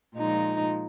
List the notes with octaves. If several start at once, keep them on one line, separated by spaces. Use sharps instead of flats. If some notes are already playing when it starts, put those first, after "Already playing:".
A#2 F3 G#3 D#4